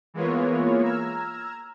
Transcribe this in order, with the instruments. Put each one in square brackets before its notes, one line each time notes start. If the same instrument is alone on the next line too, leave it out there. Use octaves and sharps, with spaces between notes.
[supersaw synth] E3 G#3 A#3 B3 F4 C#5
A#5 E6 F6 G#6